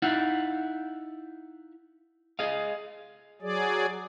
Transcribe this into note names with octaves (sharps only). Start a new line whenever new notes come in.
D#4 E4 F5 F#5
G#4 D#5 F5
F#3 G#4 D5